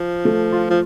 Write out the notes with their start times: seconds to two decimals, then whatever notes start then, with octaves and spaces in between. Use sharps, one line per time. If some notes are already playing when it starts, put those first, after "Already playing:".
Already playing: F3
0.25 A3
0.52 F4
0.70 F3